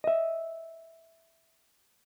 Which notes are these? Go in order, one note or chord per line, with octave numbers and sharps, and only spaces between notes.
D#5 E5